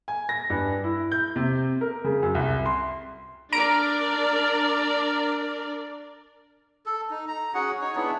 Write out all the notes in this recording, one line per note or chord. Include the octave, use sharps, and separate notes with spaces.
G#5
A#6
G2
E4
G6
C3
A#4
C#3
F#2
C2
C6
D4 A#4 D5 A#5 D7
A4
D#4
A#5
C#4 F#4 G#4 F#5
D#4 C#5
B3 D4 E4 G#4